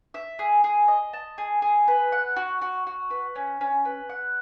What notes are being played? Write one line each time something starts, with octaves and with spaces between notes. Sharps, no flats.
E5
G#4
G#4
D#5
A5
G#4
G#4
B4
F#5
F#4
F#4
F#4
B4
C#4
C#4
B4
F#5